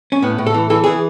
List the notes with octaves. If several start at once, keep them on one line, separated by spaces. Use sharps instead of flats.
C#4
A2 B3
A2
A4
E3
E3 A4
E3 G#4